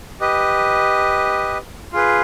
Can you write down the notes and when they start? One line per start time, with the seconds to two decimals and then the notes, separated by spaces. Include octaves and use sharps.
0.20 G4 B4 D#5
1.92 F4 G#4 B4